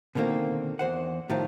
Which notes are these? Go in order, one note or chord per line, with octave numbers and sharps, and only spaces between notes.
B2 D3 D#3 A#3 C4
E2 C5 F#5
A2 D#3 F3 G3